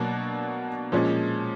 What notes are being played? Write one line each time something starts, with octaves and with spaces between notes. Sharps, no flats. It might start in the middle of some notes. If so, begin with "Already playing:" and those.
Already playing: B2 F#3 A#3 D4 F#4
A#2 F3 G#3 C#4